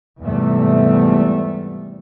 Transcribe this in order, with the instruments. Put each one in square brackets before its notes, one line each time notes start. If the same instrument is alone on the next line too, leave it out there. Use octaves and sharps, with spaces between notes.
[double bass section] E2 G#2 C3 G3 A3